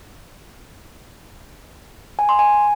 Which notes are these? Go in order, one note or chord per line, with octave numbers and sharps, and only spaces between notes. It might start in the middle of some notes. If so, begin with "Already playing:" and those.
G#5
C6
G#5